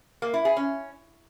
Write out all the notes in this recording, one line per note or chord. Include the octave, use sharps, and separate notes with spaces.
A#3
E4
G#4
C#4